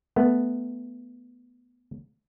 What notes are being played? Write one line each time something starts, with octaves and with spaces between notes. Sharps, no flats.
A3 B3